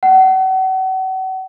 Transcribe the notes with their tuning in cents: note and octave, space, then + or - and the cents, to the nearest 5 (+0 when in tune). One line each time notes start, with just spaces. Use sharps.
F#5 +35